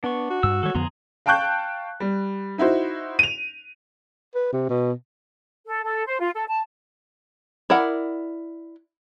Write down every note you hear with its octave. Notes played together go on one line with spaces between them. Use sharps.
B3 D4 C#6
F#4
G2 E6
D#3 G3 A4 C#5
F2 D3 B3 G#4 A#5 C6
F5 G5 A5 C#6 F#6 G6
G3
D#4 E4 F#4 C5
D#7 F7
B4
C3
B2
A4
A4
C5
F4
A4
A5
E4 A#4 D5 F#5